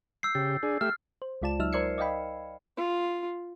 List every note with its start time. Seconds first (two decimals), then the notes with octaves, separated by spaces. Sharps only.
0.23 E6 G6 C7
0.35 C#3 G4 A6
0.63 D4 G#4
0.81 A3 G4 E5 F6
1.22 C5
1.42 C#2 G#3 F4 D5 A5 E7
1.59 C#2 F#3 D#4 E5 E6 F6
1.73 A#4 C5 D5 G#6 C7 C#7
1.98 D5 D#5 F5 G5 B5
2.77 F4